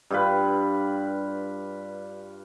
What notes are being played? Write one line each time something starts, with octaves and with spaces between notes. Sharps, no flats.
G2 F4 B4